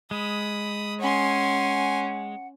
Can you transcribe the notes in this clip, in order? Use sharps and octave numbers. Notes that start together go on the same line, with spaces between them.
G#3 B5 D#6
C#4 F#5 G#5 C6